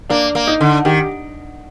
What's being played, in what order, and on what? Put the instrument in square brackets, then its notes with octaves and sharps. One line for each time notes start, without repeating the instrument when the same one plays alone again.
[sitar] A#3 [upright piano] D4
[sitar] A#3
[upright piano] D#4
[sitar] D3
[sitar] D#3 [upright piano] G4